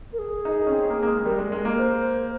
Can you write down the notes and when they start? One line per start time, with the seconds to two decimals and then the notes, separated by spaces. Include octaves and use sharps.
0.13 A#4
0.19 G#4
0.45 D#4
0.67 C#4
0.72 C4
0.90 A#3
1.03 A#3
1.07 G#3
1.25 G3 A#4
1.38 G#3
1.52 G#3
1.65 A#3
1.78 C5